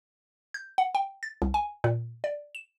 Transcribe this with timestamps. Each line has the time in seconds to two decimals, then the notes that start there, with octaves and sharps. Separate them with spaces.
0.54 G6
0.78 F#5
0.95 G5
1.23 A6
1.42 C2
1.54 G#5
1.84 A#2
2.24 D5
2.55 E7